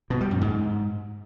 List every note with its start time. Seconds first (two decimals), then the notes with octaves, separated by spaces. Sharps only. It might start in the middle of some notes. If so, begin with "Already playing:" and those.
0.10 B2
0.21 G3
0.31 F#2
0.41 G#2